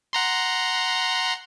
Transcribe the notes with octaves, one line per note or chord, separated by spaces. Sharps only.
F#5 A#5 C6